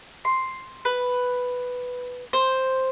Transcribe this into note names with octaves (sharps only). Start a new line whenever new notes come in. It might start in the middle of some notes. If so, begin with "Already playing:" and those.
C6
B4
C5